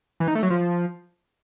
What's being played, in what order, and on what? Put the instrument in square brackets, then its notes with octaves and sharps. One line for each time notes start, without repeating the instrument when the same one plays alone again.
[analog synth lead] E3
D#4
A3
F#3
F3